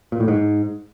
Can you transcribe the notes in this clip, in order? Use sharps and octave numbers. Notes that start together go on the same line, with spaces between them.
A#2
A2
G#2